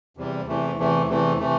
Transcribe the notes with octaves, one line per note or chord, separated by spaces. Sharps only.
E2 C3 G3
E2 C3 E3 A3
E2 C3 E3 A3
E2 C3 E3 A3
C3 E3 A3